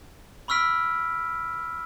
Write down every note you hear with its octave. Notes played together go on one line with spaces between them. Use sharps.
B5 C#6 E6 F6 B6 D7